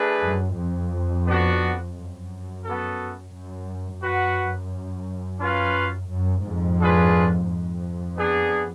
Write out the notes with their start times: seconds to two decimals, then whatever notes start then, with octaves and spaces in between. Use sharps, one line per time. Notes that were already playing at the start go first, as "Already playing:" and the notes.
Already playing: A3 D4 G#4 B4
0.22 F#2
0.57 F2
1.26 B3 D4 F#4
1.95 F#2
2.64 B3 F#4 A4
3.33 F#2
4.02 F#2 F#4 B4 F#5
5.40 C#4 F4 B4 F5
6.09 F#2
6.43 F2 G#2
6.79 D4 F4 G#4 B4
7.48 F2
8.16 B3 D4 G#4